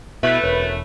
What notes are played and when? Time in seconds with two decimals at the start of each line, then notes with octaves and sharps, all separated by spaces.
0.23 B2 A3 E4 B4
0.43 E1 F#2